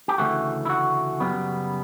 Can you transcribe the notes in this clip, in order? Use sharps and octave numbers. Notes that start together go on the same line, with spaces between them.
G4
D2 C#3 E3 A3 C#4 F#4
E4
F#4
F#2 C#3 G3 B3